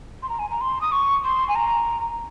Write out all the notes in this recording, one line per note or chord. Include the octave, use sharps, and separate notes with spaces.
C6
A#5
G#5
A#5
C6
D#6
C#6
C6
G#5
A#5